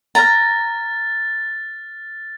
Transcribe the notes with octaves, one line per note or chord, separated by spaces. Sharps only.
A#5 F6 A6